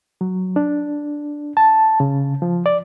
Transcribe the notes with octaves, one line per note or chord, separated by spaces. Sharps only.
F#3
D4
A5
C#3
F3
D5